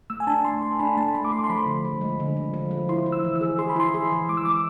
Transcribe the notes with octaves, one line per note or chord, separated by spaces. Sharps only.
A3 E6
G#5
D4 A5
A3 C6
A3 C6
D4 B5
A3 A5
A3 B5
D6
A3 C6
C6
F3 B5
D3
F3
G#3
D3
F3
F3
F3
E4 C6
E4
E6
E3
E6
G#4
G#4 C6
B5
E4 C6
G#4
E3
G#3 D6
E6
G#3 D6